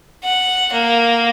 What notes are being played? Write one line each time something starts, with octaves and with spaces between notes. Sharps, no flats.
F#5
A#3